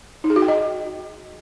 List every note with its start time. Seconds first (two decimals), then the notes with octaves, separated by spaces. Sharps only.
0.24 D#4
0.30 G#4
0.36 F#4
0.42 G5
0.48 D#5